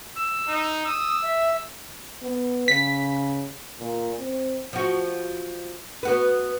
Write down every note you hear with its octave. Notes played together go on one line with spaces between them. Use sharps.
E6
D#4
D#6 E6
E5
B3
C#3 B6
A#2
C4
F3 F#4
B3 F#4 B4